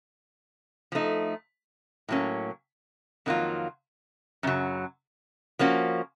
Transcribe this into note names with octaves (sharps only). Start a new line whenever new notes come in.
F3 A3 D#4
A2 F#3 A#3 C#4
F2 D#3 F#3 A#3 F4
F#2 C#3 F#3
F3 A#3 C#4 F#4